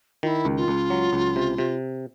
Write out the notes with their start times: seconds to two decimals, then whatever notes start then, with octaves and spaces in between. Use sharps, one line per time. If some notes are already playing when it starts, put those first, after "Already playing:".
0.23 D#3 F4
0.27 E4
0.45 C#2
0.57 F4
0.68 C#2
0.90 F#3
1.13 C#2
1.36 C3
1.58 C3